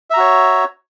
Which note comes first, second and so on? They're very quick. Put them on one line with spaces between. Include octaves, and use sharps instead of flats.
E5 A#5 F#4 C#5